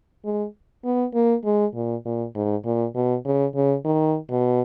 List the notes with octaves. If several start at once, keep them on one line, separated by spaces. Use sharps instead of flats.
G#3
B3
A#3
G#3
A#2
A#2
G#2
A#2
B2
C#3
C#3
D#3
B2